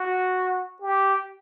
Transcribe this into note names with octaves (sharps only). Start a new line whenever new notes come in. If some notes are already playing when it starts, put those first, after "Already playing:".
Already playing: F#4
G4